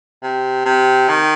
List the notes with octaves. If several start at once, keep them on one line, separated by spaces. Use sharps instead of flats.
C3
C3
D#3